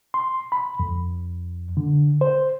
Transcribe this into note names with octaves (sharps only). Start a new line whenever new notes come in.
C6
B5
F2
D3
C5